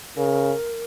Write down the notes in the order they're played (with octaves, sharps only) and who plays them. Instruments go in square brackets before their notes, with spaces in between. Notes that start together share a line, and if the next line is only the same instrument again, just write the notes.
[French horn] C#3 [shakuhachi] A#4